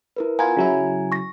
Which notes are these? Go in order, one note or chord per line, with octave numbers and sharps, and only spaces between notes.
E4 A#4 B4
B3 F4 G#5 A#5 G#6
C#3 F#3 E4
C#6 A#6